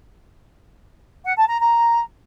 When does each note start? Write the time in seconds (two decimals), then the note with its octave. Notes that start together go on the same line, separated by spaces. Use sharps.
1.25 F#5
1.37 A5
1.48 A#5
1.60 A#5